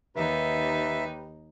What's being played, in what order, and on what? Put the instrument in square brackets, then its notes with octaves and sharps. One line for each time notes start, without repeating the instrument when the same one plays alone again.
[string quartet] D#2 D#4 [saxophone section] G4 B4 [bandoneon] E5